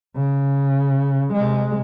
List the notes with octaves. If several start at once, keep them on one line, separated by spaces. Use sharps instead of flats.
C#3
C3 G#3